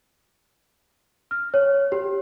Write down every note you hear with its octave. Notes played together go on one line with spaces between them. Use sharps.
F6
C#5
G4